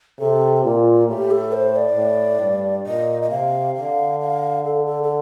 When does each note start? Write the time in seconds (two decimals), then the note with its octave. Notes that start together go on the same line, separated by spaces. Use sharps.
0.19 C3 A4
0.64 A#2 F4
1.09 A2 G4
1.31 A4
1.53 C5
1.76 D5
1.97 A2
2.41 G2
2.86 A#2 D#5
3.22 D#5
3.30 C3 F5
3.75 D3 F5
4.20 F5
4.64 A4
4.86 A4
5.03 A4